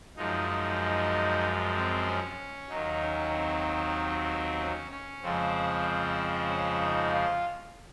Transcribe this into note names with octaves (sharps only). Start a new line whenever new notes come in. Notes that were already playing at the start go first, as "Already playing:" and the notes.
F#2 F3 G#3 D#4
D#4
D#4
C4
C#4
D#2 D#3 F#3 D#4
C#4
C4
C#4
C#4
F2 C#3 F3 G#3 C4
C#4
D#4
F4